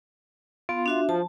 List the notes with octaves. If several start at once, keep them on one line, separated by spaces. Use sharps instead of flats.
B3 F4
D4 F#4 E5
F3 A5